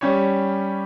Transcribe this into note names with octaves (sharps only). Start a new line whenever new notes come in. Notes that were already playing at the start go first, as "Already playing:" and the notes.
G3 C#4 G4 C#5